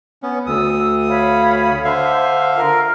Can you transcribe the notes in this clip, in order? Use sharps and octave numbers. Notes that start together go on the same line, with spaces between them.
B3 C#4
D2 D#6 E6
C#5 F5 B5
D3 C5 E5 F5
F4 A#4 F6